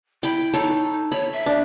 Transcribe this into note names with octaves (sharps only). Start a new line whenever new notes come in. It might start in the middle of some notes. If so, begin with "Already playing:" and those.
E4 G5 B5
D#4 A4 C#5
C#5 B5
E5
D4